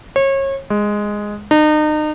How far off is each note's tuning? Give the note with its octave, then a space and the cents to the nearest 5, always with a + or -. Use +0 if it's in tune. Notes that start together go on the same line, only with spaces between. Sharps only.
C#5 -30
G#3 -5
D#4 -35